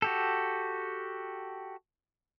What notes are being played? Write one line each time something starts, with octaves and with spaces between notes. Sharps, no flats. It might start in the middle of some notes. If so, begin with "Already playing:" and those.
F#4 G4 A4